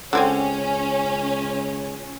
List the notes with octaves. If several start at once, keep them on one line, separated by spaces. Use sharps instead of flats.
C#2 D3 C4 C#4 G5 G#5 C6